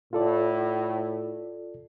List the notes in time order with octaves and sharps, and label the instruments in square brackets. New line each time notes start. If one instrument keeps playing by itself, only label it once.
[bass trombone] A2 [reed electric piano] F4 A4 D5